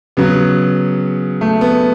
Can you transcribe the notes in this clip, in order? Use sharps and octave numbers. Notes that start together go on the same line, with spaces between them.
C#3 F#3 B3
A3
B3